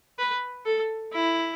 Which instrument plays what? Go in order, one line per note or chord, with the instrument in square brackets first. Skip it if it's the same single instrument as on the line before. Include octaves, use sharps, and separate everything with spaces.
[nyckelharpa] B4
A4
E4